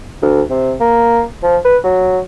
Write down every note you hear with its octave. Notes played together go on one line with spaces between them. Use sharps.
D2
C3
A#3
F3
B4
F#3